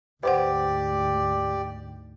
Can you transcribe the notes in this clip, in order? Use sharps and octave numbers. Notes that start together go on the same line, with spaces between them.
D2 G#2 G4 B4 C5 D5 F#5